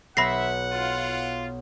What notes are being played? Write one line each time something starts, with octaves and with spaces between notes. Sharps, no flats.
B1 B4 E5 F#5 B5 A#6 C7
F4